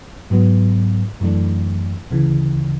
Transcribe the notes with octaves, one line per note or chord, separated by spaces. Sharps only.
G#2 F#3 B3
F#2 E3 A3 D4
D2 C#3 E3